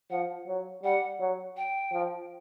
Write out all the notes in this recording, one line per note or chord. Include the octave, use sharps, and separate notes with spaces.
F3 F#5
F#3
G3 F#5
F#3
G5
F3